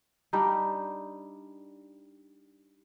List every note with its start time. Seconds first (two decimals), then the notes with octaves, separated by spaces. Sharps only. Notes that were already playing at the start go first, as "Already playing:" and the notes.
0.33 G3 D4 D#4